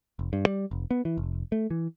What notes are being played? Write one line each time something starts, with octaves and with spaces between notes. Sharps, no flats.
F1
G2
G3
F1
B3
E3
F1
A3
E3